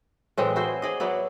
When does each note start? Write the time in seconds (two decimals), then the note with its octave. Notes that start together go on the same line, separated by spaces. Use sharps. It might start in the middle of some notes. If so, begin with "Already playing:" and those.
0.37 A2 E3 G#3 C4
0.56 E4 F#4 G#4 C5
0.82 G#4 D5 D#5
1.00 F#3 B3 E4 D5